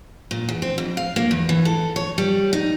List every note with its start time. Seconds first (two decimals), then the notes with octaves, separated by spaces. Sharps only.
0.31 A#2
0.49 E2
0.62 C4
0.78 F2
0.97 F5
1.16 A#3
1.31 E2
1.49 E3
1.65 A4
1.96 C#5
2.18 G3
2.53 D#4